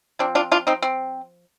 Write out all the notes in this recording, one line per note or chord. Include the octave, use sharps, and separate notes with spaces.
F3 C4 D4
D4 F4
D4 F4
C4 D#4
C4